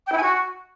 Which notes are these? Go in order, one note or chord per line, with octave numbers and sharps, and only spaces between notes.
G5
E4
G#5
F#4